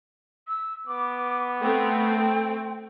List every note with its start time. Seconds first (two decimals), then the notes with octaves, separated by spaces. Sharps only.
0.48 E6
0.87 B3 D6
1.61 A3 C4 G5